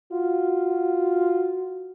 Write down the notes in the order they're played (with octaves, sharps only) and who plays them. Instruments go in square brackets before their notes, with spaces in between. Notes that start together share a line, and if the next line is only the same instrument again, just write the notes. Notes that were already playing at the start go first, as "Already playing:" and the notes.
[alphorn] F4 [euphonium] F#4